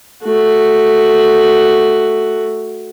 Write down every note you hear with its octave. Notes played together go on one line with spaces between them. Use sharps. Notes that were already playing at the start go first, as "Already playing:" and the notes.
A3 F#4